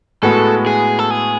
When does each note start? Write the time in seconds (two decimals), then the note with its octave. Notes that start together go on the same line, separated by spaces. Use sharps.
0.22 A2 G#3 B3 F#4 A4
0.67 G#4
0.99 A4
1.11 G#4